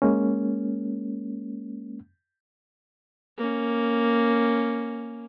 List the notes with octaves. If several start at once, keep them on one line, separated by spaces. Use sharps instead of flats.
G#3 A#3 C#4
A#3 C#4